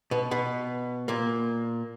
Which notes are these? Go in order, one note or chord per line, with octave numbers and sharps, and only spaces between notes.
B2 B3
B2 B3
A#2 A#3